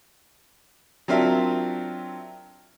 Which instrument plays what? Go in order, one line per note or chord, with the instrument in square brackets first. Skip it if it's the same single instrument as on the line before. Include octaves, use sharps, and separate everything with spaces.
[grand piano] F#3 C4 D4 F4 A#4 E5